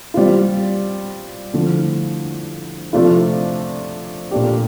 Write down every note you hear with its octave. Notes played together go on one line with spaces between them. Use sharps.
G3 C4 F4
D3 F3 A3 E4
C3 F3 A3 D4 F4
A#2 A3 D4 G4